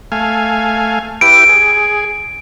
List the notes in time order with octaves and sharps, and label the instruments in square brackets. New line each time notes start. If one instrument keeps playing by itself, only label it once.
[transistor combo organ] A3 F5 G#5
[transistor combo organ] E4 G4 B4 [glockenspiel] D7
[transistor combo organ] G#4